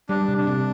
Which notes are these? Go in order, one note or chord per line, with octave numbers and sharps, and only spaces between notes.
G3 D4
C3
D4
C3